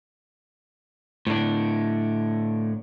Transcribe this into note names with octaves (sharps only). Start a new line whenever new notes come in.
A2 D4